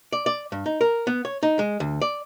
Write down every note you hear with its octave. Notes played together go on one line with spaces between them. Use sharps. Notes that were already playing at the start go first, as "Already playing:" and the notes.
D5
D5
G2
D#4
A#4
B3
C#5
D#4
G#3
D2
D5